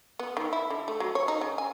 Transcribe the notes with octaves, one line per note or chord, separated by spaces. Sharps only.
B3
D#3
E4
D3
A3
F#3
C#5
D#4
C#3
G#5